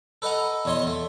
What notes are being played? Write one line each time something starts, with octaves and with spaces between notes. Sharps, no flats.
A4 B4 D#5 F#5 A#5
E2 B2 C#5 D#5 C6
A3